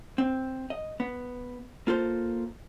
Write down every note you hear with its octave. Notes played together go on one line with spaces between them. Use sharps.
C4
D#5
B3
A#3 F4 A4 C5